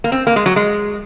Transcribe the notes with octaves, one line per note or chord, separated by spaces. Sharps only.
A#3
C4
A#3
G#3
F#3
G#3